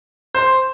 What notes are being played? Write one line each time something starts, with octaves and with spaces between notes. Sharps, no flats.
C5